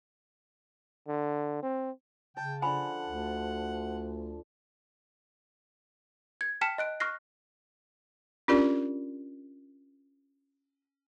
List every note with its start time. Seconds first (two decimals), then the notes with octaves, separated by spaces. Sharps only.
1.08 D3
1.63 C4
2.37 C#3 G5 A5
2.62 D3 F3 F#5 G#5 B5
3.07 D2
6.41 G#6
6.61 G5 A5 F6 B6 C#7 E7
6.78 D#5 F#6 D7
7.00 C#6 F6 F#6 A#6 C7
8.48 C#4 D4 F4 G4 A#4 D5